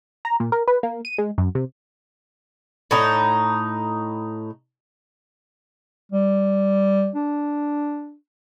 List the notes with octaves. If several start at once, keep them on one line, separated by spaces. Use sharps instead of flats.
A#5
A#2
A#4
B4
A#3
D#7
G#3
F#2
C3
A2 D#4
G3
D4